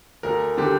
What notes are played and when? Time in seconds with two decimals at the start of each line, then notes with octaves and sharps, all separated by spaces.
0.23 D2 A#4
0.58 D3 G4